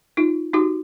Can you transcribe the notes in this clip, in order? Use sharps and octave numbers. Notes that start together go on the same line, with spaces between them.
D#4 F4
D#4 F#4 G4